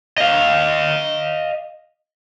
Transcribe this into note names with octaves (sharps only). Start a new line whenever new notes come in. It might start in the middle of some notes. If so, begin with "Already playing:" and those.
D#5 F5